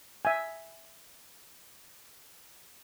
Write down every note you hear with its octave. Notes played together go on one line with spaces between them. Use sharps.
E5 G#5